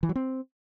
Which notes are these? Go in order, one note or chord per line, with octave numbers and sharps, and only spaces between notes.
E3
F#3
C4